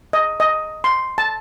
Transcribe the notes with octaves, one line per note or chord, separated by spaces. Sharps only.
D#5
D#5
C6
A5